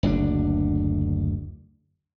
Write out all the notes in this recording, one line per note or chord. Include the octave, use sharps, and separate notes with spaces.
F#1 D2 C4 D4